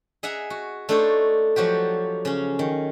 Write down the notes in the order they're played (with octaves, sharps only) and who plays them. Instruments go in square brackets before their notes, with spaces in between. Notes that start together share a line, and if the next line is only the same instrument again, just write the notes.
[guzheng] G#4 D#5 E5 F#5 G#5 A#5
F#4
A3 D4 D#4 A4 C5 C#5
F3 F#3 F#4 G4
C#3 C#4
D#3